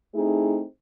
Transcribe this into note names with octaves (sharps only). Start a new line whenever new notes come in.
A3 C4 D#4 E4 G#4